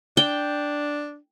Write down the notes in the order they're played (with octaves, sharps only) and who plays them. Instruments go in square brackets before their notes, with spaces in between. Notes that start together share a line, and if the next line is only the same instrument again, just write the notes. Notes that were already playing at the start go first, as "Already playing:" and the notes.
[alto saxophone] D4 [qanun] G5